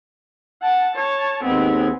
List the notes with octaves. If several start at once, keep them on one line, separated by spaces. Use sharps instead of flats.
F#5 A5
C#5 A5
D#2 G#3 B3 C4 G#5